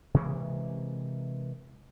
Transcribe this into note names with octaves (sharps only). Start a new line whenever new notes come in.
C3 E3 G#3 A#3